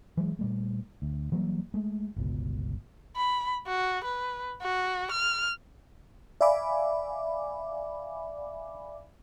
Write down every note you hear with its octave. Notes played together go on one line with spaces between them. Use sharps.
E3 F#3 G#3
A#2 G3 A3
D2
E3 F#3 G3 A#3
G#3 A3
G1 C#2 B2
B5
F#4
B4
F#4
F6
D5 E5 F5 G#5 B5 D6